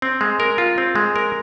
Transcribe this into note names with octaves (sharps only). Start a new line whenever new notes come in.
C4
G#3
A#4
F4
C4
G#3
A#4